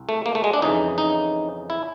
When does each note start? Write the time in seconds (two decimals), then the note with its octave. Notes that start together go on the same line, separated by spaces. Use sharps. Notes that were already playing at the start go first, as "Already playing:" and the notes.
Already playing: C2
0.09 A3
0.26 A#3
0.35 A3
0.44 G#3
0.53 D4
0.62 F2 C#3 E3 D#4
0.98 D#4
1.70 E4